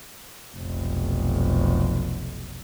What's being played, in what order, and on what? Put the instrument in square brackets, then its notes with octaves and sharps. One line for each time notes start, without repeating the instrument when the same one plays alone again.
[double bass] F1 B1